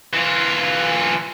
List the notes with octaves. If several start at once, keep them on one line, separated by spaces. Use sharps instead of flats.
E3 F4